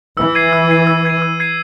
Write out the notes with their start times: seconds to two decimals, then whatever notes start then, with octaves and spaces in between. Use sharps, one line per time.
0.17 E3 E6
0.35 G#6 C7 D#7
0.53 E6
0.70 G#6 C7 D#7
0.87 E6
1.05 G#6 C7 D#7
1.22 E6
1.40 G#6 C7 D#7